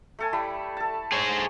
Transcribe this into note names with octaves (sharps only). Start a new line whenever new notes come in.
A3 A4 G#5
G3 A3 E4
A4 A5
G#4 C5 C#5